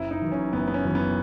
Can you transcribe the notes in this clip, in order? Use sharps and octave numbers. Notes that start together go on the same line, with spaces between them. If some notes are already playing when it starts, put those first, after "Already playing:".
Already playing: F#1 E4
D#4
F#2 E3
C#4
F#1 B3
B3
C#4
F#2 E3
B3